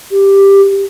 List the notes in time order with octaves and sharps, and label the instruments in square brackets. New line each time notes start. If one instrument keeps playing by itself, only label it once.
[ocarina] G4